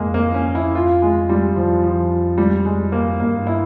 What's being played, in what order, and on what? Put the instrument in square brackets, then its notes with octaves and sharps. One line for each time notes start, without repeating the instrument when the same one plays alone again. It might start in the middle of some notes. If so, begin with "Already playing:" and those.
Already playing: [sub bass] F2 [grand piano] G#3 A#3
[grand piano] A#3
C#4
E4
F4
G#3
G3
[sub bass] F2 [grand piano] F3
[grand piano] F3
G3
G#3
A#3
[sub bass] G2 [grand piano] A#3
[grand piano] E4